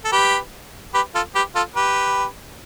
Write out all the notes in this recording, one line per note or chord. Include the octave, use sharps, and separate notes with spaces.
A4
G4 B4
G4 B4
F4 A4
G4 B4
F4 A4
G4 B4